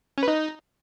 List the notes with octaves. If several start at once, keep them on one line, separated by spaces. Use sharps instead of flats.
C#4
B4
D#4